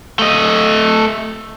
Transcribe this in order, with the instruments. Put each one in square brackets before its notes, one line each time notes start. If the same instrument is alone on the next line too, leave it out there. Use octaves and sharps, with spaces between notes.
[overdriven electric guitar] A3 D#5